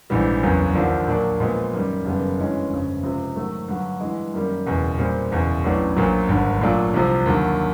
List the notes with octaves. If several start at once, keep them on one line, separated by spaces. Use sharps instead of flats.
A#1 G#2 E3 G3
F#1 E2 C#3 F#3 B3
D#2 D3 F3 A#3 D4
A#2 F#3 A#3 D4
A#2 F3 G#3 B3
F#2 D#3 G3
F#1 F#2 D#3 G3 B3
G2 E3 G#3 C#4
G1 F2 C#3
C#2 C3 F3
G#2 D#3 F#3 A3
G2 D3 F#3
G2 E3 G#3
F#2 D#3 G3 A#3
F#1 E2 B2
A#2 G3 C4
F#1 E2 B2
A1 A2 F#3 B3 D4
A#1 A#2 F#3
G#1 G2 D3
A#2 F#3 A3 D4 F4
C2 C3 F3
D#2 D3 F#3